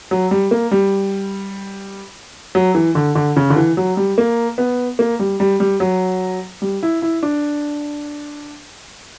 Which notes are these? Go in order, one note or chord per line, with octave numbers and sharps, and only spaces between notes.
F#3
G3
A#3
G3
F#3
E3
D3
D3
C#3
D3
E3
F#3
G3
A#3
B3
A#3
G3
G3
G3
F#3
G3
E4
E4
D4